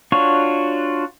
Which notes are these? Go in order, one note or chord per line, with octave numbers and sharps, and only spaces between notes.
D4 F4 F#4 C#5